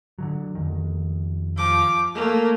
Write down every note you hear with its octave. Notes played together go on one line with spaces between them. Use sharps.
D3 D#3 F#3
F2 D#3
F3 D6
A3 A#3